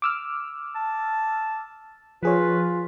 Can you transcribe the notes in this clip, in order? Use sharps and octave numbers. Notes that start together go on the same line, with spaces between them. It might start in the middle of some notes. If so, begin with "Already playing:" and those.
D6 E6 F6
A5
F3 F4 G#4 B4 C#5